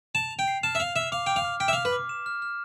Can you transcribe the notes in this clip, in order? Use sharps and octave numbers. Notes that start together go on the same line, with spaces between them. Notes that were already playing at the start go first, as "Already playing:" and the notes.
A5 F7
F7
G5
C7
A5 F6
E5
F5 F7
E5 F7
F5 D6
G5 D6
F5
F6
G5 B6
E5
F5
F6
B4
D6
E7
F6
F6